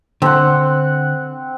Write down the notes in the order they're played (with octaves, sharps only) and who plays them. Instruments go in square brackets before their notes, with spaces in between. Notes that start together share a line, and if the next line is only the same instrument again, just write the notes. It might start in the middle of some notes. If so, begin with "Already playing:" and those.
[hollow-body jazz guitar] D3 [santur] C4 F#5